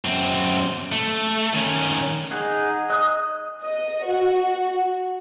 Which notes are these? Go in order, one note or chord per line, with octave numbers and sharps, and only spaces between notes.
F#2 C4
A3
D#3 C#4
D#4 G#4 F#5
D#5 D#6 F#6
D#5
F#4